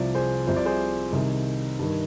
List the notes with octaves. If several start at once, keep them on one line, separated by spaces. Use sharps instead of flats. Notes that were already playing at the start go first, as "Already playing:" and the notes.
Already playing: C2 C3 F3 D5
G#4 C5
C2 C3 F3 C5
D5
G#4 C5
C2 C3 D#3
G2 D#3